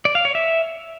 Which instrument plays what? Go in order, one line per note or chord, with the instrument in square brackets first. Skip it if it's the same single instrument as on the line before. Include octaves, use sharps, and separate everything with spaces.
[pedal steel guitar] D5
F5
C#5
E5